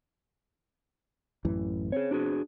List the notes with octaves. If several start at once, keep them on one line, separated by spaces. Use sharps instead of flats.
A1 F#2 E3
C4 G#4 C#5
D4 F#4 G#4